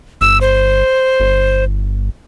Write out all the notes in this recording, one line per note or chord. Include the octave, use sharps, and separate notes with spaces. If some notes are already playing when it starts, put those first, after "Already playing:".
G1 E6
C5
G1